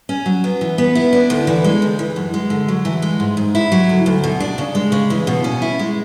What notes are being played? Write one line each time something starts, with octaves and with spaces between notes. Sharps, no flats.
C#4
F#3
B3
E3
B3
E4
D4
D2
E3
G#3
D2
E3
F#2
G#3
D3
F#3
E3
G#3
G#2
G#2
E4
F#3
D2
D2
B2
D4
C#3
G#3
C#3
E3
B2
C#4
E4
G#3